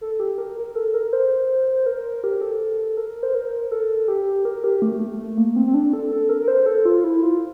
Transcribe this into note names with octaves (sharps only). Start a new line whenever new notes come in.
A4
G4
A#4
A#4
A4
A#4
C5
A#4
G4
A4
A#4
C5
A#4
A4
G4
A#4
G4
A3
A3
A3
A3
A#3
C4
C4
D4
A4
A4
A#4
A#4
C5
A4
F4
E4
F4